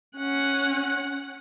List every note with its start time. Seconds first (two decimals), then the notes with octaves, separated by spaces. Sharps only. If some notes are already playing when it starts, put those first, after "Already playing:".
0.17 C#4 F#5